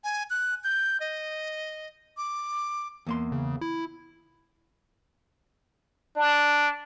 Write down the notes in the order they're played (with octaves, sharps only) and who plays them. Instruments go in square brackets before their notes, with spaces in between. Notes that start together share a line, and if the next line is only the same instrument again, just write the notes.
[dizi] G#5
F#6
G6
D#5
D6
[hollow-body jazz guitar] E2 A#3 C6
[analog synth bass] C#3
E4
[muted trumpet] D4